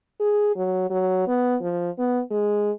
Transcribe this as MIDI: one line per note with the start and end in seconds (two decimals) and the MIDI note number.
0.20 0.51 68
0.56 0.86 54
0.90 1.23 54
1.27 1.56 59
1.61 1.90 53
1.98 2.21 59
2.31 2.72 56